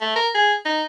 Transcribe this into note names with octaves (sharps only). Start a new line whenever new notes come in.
A3
A#4
G#4
D#4